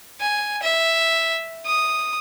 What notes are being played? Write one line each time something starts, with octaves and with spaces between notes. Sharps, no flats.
G#5
E5
D#6